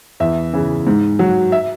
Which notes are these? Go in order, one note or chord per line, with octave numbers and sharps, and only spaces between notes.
E2 E5
C#3 E3
G#2
F#3
E5